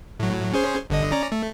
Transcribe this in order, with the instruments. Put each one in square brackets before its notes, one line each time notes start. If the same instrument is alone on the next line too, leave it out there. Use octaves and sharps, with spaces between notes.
[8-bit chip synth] A2 F#3
C#4 G#4 C5
G1 D3 D#5
C#4 D5 A#5
A3